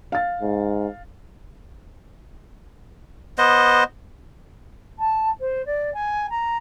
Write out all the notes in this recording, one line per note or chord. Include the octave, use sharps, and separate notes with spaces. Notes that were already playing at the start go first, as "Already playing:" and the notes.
F5 A6
G#2
B3 C5 D#5
A5
C5
D5
G#5
A#5